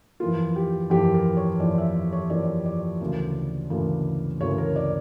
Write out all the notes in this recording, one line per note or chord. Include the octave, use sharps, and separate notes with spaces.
F2 E3 A#3 F4
G4
F2 E3 A#3 G4
A#4
C#5
F2 E3 A#3 D5
E5
C#5
F2 E3 A#3 D5
D5
D2 C#3 E3 A#3
D2 C#3 E3 A#3
D2 C#3 E3 A#3 C#5
A#4
D5